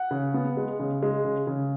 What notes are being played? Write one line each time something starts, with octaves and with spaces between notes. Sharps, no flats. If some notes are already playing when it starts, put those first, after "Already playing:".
Already playing: F#5
C#3
B3
G#3
C#3
G#3
C#3
C#3